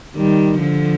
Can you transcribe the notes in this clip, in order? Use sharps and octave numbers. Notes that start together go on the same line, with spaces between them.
D#3 G3
D3 F3